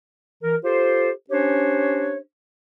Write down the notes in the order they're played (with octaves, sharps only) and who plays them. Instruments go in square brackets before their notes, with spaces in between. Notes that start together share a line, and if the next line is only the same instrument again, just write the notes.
[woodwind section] E3 A#4
F4 G4 A4 C5
C#4 D4 G4 C5 C#5